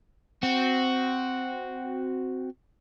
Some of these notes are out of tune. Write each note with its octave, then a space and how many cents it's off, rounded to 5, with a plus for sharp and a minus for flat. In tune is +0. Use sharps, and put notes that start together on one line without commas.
C4 -10 F#4 +0